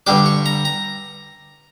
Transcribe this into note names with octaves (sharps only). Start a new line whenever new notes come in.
G2 D3 G3 D4 D6
C#6
A#5
A#5